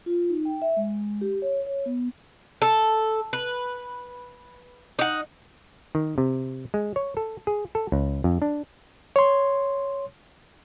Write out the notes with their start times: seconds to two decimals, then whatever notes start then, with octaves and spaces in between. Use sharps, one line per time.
0.06 F4
0.30 D#4
0.45 G5
0.62 E5
0.77 G#3
1.21 G4
1.42 C#5
1.66 C#5
1.86 B3
2.62 A4
3.33 B4
4.99 D#4 F#5
5.95 D#3
6.18 C3
6.74 G#3
6.96 C#5
7.17 A4
7.47 G#4
7.75 A4
7.92 C#2
8.24 F2
8.42 D4
9.16 C#5 C6